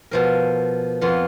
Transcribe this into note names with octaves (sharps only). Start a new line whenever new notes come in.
B2 F3 A#4
F2 B3 F4